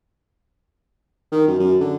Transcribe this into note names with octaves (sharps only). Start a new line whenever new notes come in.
D#3
F#2
F#2
D3